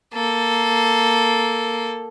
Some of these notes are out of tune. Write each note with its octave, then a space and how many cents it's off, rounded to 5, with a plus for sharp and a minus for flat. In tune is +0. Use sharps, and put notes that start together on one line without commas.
A#3 +0 A4 +0